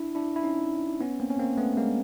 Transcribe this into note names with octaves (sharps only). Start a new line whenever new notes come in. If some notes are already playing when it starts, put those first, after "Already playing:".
Already playing: D4 E4
D4 E4
E4
C#4 D#4
B3 C#4
A#3 C4
C#4
A#3 C4
A3 B3
G#3 A#3